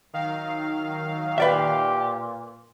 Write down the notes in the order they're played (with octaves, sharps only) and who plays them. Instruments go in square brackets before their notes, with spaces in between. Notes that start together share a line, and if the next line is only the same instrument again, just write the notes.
[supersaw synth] D#3 F5 [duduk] F#3
[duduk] A#2 [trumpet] G4 [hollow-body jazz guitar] B4 D5 E5